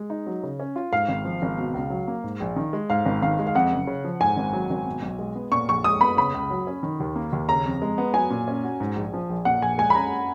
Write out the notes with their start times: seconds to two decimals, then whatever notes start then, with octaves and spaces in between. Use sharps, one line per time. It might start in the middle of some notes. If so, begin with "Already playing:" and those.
Already playing: G#3
0.10 D#4
0.26 F#3
0.43 C#3
0.60 C#4
0.76 F4
0.92 G#2 F5
1.09 G#1
1.25 F3
1.42 G#1
1.57 B2
1.74 C#2
1.90 F#3
2.07 A#3
2.24 G#2
2.40 A#1
2.56 D#3
2.73 G#3
2.90 G#2 F5
3.06 G#1
3.22 D#3 F5
3.39 G#3
3.47 F5
3.55 F2 F#5
3.72 F#1
3.87 C#3
4.04 F3
4.21 G#2 G#5
4.37 G#1
4.53 F#3
4.70 G#1
4.86 B2
5.02 B1
5.19 G#3
5.35 B3
5.51 A#2 C#6
5.68 A#1 C#6
5.84 G#3 D#6
6.01 B3 B5
6.17 C#3 B5
6.34 C#2
6.51 F#3
6.67 C#4
6.83 D#3
7.00 D#2
7.15 A#3
7.33 D#2
7.49 C#3 A#5
7.65 F2
7.82 G#3
7.98 B3
8.14 F#3 G#5
8.30 A#2
8.48 C#4
8.64 F#4
8.80 G#2
8.96 A#1
9.13 F3
9.29 A#1
9.45 A#2 F#5
9.62 A#1 G#5
9.78 G#3 G#5
9.90 B5
9.95 C#4 A#5